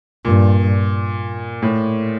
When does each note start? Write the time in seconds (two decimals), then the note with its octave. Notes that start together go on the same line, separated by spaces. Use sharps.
0.25 G2 A#2
1.62 A2